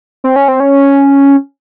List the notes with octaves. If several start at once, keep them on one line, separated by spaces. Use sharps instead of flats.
C4
C#4
C4
C#4